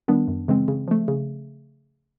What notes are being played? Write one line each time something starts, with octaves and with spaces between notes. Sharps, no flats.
D#3 G3 B3 D4
F#2
C#3 E3 G#3 C4
C#3
F3 A3
C#3